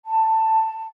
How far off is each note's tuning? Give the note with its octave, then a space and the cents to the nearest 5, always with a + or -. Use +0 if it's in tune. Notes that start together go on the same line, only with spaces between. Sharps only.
A5 +15